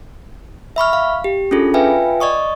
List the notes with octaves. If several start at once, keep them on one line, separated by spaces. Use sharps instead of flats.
E5 B5 C#6 F6
F5
G4
C#4 D4 F4 G#4 A4
F4 B4 E5 F5 G5 G#5
D5 D#5 C#6 D#6